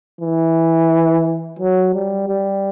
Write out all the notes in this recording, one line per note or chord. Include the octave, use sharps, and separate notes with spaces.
E3
F#3
G3
G3